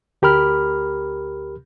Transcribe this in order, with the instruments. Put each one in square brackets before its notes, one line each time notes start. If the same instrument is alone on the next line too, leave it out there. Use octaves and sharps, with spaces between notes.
[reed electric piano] D2 G4 A#4 B5 F6